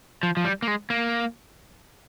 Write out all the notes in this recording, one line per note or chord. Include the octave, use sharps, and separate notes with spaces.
F3
F3
G3
A#3
G#3
A#3